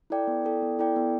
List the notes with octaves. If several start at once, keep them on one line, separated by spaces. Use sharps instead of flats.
E4 A4 D5 G5
B3
E4 A4 D5 G5
B3
E4 A4 D5 G5
B3